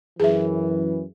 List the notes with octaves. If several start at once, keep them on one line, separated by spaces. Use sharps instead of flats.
F#2 E3 G#4 E5